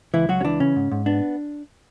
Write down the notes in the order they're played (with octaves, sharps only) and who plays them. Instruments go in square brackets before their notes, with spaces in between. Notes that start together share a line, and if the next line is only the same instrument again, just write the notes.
[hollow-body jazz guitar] C#2 E3 E4
C#2 F#3 F#4
C#4
E3 D4
C#3 C#4
G#2
G#2
B3 D4